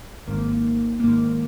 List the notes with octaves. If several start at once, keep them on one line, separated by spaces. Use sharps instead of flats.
G#1 G#2 D#3 A#3
G#2 D#3 A#3